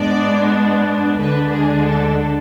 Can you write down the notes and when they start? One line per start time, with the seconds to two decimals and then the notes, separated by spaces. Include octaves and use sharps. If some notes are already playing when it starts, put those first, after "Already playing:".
Already playing: G#2 G#3 B3 D4 D5
1.18 D2 D3 G#3 D4 B4
1.52 G#4
1.87 A4